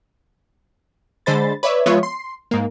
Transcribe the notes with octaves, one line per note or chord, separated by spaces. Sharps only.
D3 G#3 C5 B5 A6
B4 C#5 D5 E5
F3 G#3 B3 F4 C#5 E5
C6
G#2 A#3